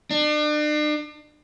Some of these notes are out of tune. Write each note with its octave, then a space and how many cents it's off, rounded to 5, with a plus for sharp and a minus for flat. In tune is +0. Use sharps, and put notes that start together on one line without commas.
D4 +40